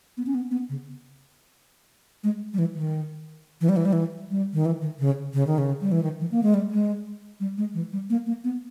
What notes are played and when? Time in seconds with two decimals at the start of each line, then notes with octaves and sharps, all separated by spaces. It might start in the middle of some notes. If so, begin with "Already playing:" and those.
0.17 B3
0.26 C#4
0.35 B3
0.51 B3
0.69 C#3
2.24 G#3
2.54 G3
2.59 E3
2.75 D#3
3.61 E3
3.69 G3
3.76 E3
3.85 G3
3.93 E3
4.31 G3
4.53 D#3
4.65 E3
4.82 D#3
4.99 C#3
5.34 C#3
5.47 D#3
5.58 C#3
5.81 G3
5.92 E3
6.03 D#3
6.20 E3
6.32 A#3
6.43 G#3
6.54 G3
6.71 G#3
7.40 G3
7.58 G#3
7.74 E3
7.93 G3
8.10 A#3
8.26 A#3
8.44 B3